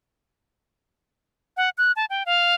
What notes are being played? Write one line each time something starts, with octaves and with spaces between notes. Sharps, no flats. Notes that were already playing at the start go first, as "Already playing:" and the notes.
F#5
F#6
A5
G5
F5